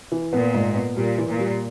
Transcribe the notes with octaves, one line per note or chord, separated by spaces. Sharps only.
E3
A#2 B3
G#2
B3
A#2 G3
E3
A#2
G3